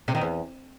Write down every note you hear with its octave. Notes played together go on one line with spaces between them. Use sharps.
C3
D#3
E2